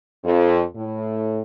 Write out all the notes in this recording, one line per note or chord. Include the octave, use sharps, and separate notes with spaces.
F2
A2